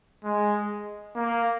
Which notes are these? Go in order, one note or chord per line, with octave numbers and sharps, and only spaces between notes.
G#3
A#3